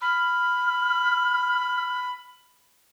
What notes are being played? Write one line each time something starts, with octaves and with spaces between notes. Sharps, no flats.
B5 F6